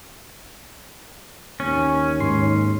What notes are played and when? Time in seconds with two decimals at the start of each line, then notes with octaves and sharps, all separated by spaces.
1.60 D#2 C#4
2.20 G#2 C6 C7